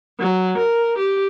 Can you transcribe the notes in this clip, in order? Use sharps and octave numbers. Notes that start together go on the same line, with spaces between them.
F#3
A#4
G4